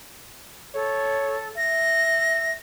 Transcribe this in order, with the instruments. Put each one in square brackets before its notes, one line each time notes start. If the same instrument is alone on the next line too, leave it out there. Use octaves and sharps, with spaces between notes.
[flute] A4 [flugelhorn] C#5
[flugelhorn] E5 [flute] A#6